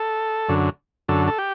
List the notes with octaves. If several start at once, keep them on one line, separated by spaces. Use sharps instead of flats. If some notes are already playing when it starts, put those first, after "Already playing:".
Already playing: A4
F#2 D3
F#2 D3 A4
A4
G4